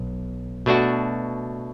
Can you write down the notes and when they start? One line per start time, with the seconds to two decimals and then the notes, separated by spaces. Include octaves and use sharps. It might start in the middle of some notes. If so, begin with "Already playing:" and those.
Already playing: B1
0.66 B2 A3 D4 F#4